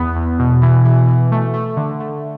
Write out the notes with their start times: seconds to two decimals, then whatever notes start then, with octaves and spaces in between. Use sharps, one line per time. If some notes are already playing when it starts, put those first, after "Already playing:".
Already playing: E2 B3
0.15 E2
0.39 B2
0.62 E3
0.85 E3
1.08 E3
1.32 A3
1.54 A3
1.77 D3
2.00 A3